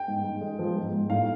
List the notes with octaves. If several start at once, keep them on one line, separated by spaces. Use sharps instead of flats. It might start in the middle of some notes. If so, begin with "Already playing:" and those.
Already playing: G5
G#2
G#2
G#3
F3
G#2
G#2
A2 F5